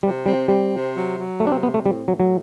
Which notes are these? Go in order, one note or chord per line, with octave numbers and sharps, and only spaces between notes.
C3 G3
G3 C4
G3 C4
C3
F#3
F#3
C3 A3
D4
C4
B3 C4
A3
A2 G3
A2 F#3
F#3